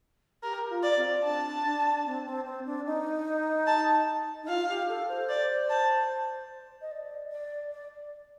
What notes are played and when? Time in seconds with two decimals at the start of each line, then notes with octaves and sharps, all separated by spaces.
0.43 G4 A#4
0.69 F4
0.83 D5
0.96 C4
1.24 D4 A5
1.65 D4
2.05 C4
2.26 C4
2.45 C4
2.66 D4
2.86 D#4
3.67 A5
4.43 D#4
4.48 F4 F5
4.69 G4
4.88 A4
5.08 C5
5.29 D5
5.70 A5
6.81 D#5
6.91 D5
7.31 D5
7.71 D5